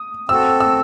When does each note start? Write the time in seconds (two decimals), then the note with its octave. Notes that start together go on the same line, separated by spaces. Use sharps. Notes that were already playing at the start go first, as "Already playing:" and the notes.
Already playing: D#6
0.29 C4 F#4 A4 E6
0.60 E6